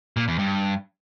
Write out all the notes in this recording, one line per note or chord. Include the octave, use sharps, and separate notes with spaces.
A#2
E2
G2